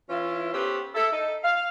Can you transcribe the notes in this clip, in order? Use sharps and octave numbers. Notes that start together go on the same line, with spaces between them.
E3 C#4 E4 F4
B3 C#4 G4 A4 B4 C5
E4 A4 E5
D#4 A4
F5